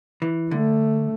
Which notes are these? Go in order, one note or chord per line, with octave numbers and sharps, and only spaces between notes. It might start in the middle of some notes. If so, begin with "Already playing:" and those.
E3
D3 A3